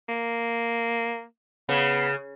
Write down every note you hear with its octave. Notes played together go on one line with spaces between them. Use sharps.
A#3
C#3 B3